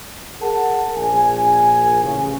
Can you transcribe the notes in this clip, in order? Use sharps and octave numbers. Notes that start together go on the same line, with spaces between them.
G#4 A#4 F#5 A5
A#1 G#5
A1 C#3